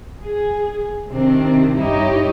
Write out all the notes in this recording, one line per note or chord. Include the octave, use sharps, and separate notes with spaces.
G#4
C3 D#3 C4 D4
G2 D#4 E4 G4 C#5 D#5